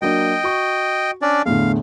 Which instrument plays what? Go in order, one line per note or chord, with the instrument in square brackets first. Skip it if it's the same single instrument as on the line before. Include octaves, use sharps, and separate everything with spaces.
[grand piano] F#3 A#3 D4 [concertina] D#5 G5
[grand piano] F#4 C#6
[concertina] C#4 D4 D5
[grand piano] E2 A2 D3 [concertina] F5